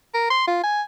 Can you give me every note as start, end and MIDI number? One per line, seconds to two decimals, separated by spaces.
0.14 0.26 70
0.30 0.47 84
0.47 0.60 65
0.63 0.82 80